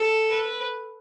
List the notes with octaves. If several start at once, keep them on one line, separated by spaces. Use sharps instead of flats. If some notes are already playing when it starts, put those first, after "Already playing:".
Already playing: A4
B4